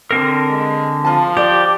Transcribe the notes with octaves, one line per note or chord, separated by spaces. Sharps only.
D3 C4 A#4
G#3
F3 F4 A5
G4 D5